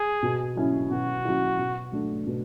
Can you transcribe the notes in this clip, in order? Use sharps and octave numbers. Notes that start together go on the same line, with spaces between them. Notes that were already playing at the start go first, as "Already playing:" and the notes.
Already playing: G#4
B2
F#3 C#4 E4
B2 F#4
F#3 C#4 E4
B2
F#3 A3 D4
B2